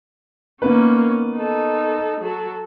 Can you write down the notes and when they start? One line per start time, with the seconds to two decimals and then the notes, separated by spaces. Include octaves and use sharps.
0.62 D#3 A#3 B3 C#4 B4
1.37 D#4 A4
2.21 F#3 A4